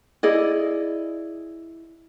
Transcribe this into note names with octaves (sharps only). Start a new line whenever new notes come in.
E4 G#4 D5 D#5